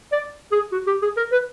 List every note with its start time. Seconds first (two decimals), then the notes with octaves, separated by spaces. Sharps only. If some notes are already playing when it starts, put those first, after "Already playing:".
0.12 D5
0.52 G#4
0.72 F#4
0.87 G4
1.02 G#4
1.17 A#4
1.32 B4